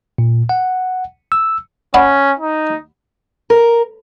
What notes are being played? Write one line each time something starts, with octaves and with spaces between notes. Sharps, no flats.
A#2
F#5
E6
C#4 D5 F#5 B5
D#4
A#4